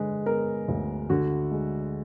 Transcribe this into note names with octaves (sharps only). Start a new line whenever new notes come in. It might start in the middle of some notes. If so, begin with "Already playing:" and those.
Already playing: D3 G#3 B4
B3 A#4
D2
D3 F#4
G#3